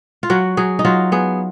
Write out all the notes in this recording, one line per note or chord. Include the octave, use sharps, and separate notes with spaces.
F4
F#3 F#4
F#3 G#4
D#4
F#3 F4
B3 G#4